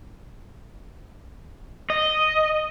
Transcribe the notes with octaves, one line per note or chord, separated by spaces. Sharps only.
D#5